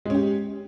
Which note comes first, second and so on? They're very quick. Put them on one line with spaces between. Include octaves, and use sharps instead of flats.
G#3 C#4 G4